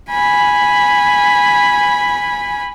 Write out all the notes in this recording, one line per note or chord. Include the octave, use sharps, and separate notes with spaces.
G#5 B5